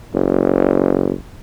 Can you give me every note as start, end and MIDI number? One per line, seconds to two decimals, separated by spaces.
0.14 1.13 30